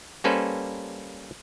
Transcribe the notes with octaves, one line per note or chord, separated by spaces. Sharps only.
G3 A#3 C#4 A4 B4 C5